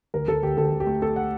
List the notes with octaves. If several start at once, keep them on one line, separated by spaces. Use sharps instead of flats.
D2 A#4
D2 A4
D2 G4
D2 A4
D2
G4
A3
A3 A4
F#5